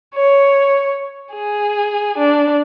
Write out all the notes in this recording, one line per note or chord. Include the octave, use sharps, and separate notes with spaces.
C#5
G#4
D4